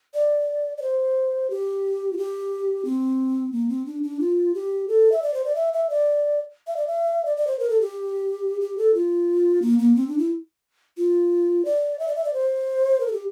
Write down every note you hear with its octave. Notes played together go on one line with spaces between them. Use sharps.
D5
D5
C5
G4
F4
G4
C4
A#3
C4
D4
D4
F4
G4
A4
E5
D5
C5
D5
E5
E5
D5
E5
D5
E5
D5
D5
C5
A#4
A4
G4
G4
A4
F4
A#3
A#3
C4
D4
E4
F4
D5
E5
D5
E5
D5
C5
A#4
A4
G4